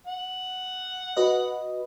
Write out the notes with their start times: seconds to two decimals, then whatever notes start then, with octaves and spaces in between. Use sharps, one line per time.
0.07 F#5
1.17 F#4 B4 D#5